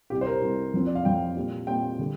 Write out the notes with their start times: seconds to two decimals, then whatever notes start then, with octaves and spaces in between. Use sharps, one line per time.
0.10 C2 C3 G3 G4
0.21 C5
0.27 A#4
0.41 C2 C3 G3
0.74 F2 F3 C4
0.86 D5
0.95 F5
1.05 F2 F3 C4 G5
1.36 A#2 G3 C4
1.67 A#2 G3 C4 G5
1.99 D3 G3